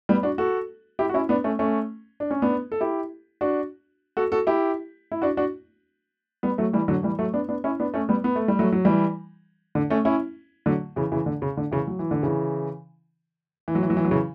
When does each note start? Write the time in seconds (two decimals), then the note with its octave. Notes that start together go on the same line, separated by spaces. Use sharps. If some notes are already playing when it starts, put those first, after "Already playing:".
0.09 G3 B3
0.23 D4 F#4
0.38 F#4 A4
0.99 E4 G4
1.09 F#4
1.14 C#4 E4
1.29 B3 D4
1.44 A3 C#4
1.59 A3 C#4
2.20 D4
2.31 C#4
2.42 B3 D4
2.72 A4
2.81 E4 G4
3.41 D4 F#4
4.17 F#4 A4
4.32 F#4 A4
4.47 E4 G4
5.12 E4
5.22 D4 F#4
5.37 D4 F#4
6.43 G3 B3
6.58 F#3 A3
6.73 E3 G3
6.88 D3 F#3
7.03 E3 G3
7.19 F#3 A3
7.34 B3 D4
7.49 B3 D4
7.64 C#4 E4
7.80 B3 D4
7.94 A3 C#4
8.09 G3 B3
8.24 B3
8.36 A3
8.48 G3
8.59 F#3 A3
8.72 F#3
8.85 E3 G3
9.75 D3
9.90 A3 C#4
10.05 C#4 E4
10.66 D3 F#3
10.96 C#3 E3
11.12 C#3 E3
11.26 D3
11.42 C#3
11.57 D3
11.72 C#3 E3
11.87 F#3
11.99 E3
12.11 D3
12.23 C#3 E3
13.68 E3
13.75 F#3
13.83 E3
13.90 F#3
13.97 E3
14.05 F#3
14.11 C#3 E3